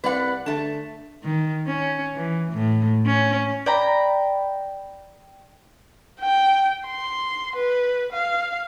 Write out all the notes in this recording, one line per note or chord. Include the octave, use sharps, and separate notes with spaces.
C2 B4 D5 F#5
D3 A3 A5
D#3
C#4
E3
A2
C#4
D5 G5 A#5 B5
G5
C6
B4
F5